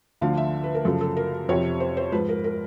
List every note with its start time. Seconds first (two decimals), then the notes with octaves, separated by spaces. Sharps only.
0.21 D2 D3 F3 F5
0.37 E5
0.64 B4
0.74 A#4
0.85 F#2 C#3 F3 A4
1.01 A4
1.17 A#4
1.49 F2 C3 F3 C#5
1.80 C5
1.97 C5
2.12 G#2 F3 B4
2.29 A#4
2.44 A#4